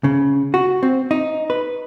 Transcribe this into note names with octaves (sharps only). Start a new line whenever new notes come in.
C#3
F#4
C4
D#4
B4